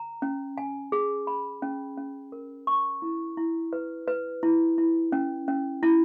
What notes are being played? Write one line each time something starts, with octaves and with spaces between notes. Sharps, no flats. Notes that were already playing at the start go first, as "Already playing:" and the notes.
Already playing: A#5
C#4
G#5
G#4
B5
C#4
C#4
A#4
C#6
E4
E4
B4
B4
E4
E4
C#4
C#4
E4